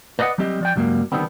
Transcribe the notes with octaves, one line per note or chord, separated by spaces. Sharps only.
B4 D5 D#5 F5 F#5
F#3 G3 C4 G4 D#5
F3 D5 G5
C#2 G2 F#3 G3 A#3
D3 D#3 F3 G3 B3 C4